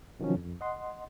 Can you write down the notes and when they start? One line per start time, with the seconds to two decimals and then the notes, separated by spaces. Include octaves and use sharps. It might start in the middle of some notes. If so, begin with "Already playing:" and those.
0.20 C3 D#3 F3 F#3 C#4
0.36 F2
0.61 D#5 F#5 C6